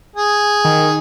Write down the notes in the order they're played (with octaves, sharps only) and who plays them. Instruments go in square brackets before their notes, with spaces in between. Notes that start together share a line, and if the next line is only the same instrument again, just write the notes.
[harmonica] G#4
[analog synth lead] D#3